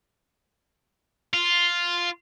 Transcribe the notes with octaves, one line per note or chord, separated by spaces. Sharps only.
F4